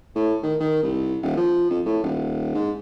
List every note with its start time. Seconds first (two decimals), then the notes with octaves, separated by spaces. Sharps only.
0.16 A2
0.43 D#3
0.60 D#3
0.83 C2
1.23 D#1
1.37 F3
1.71 F2
1.86 A2
2.03 D#1
2.55 G#2